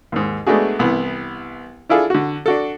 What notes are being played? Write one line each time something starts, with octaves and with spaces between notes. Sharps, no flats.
D#2 G#2
G#3 A3 B3 D4 F#4 G#4
C2 E3 B3
D4 E4 F4 G#4 A4
D3 F#4
D4 F#4 A4